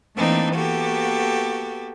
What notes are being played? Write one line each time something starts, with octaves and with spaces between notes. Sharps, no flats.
E3 A3 A#3 C4 D4 D#4
A#3 B3 F#4 G4 A4